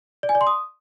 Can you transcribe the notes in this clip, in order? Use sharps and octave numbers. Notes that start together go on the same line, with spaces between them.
D5
G#5
D5
C6
D#6